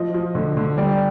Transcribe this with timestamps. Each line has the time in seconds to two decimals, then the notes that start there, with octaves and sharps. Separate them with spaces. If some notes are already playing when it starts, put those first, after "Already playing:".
Already playing: F3 D#5
0.14 F3
0.35 D3
0.57 D3
0.78 G3 D5